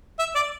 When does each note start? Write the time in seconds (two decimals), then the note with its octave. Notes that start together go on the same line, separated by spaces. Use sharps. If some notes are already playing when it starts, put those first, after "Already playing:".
0.19 E5
0.35 D5